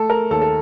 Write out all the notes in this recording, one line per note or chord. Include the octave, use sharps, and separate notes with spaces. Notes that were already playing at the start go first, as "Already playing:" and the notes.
Already playing: A3 A4
A#4
D#2 A4
A4